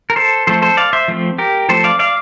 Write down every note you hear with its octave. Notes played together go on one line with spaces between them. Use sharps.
A#4
A4 C5
F3 A3 C4 A4 C5
A4 C5
D5 F5
C5 E5
F3 A3 C4
G4 A#4
F3 A3 C4 A4 C5
D5 F5
D5 F5